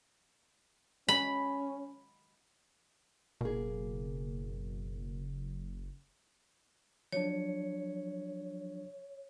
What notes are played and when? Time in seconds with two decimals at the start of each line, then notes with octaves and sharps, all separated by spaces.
1.09 C#4 B5
3.41 F#1 B2 A#3 G#4
7.13 F3 F#3 D4 C#5